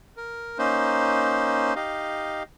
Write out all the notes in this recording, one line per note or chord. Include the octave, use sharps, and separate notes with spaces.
A#4
A#3 C#4 D#4 C5
D#4 G4 D#5 F5